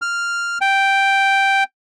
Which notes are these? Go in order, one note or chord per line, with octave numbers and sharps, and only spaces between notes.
F6
G5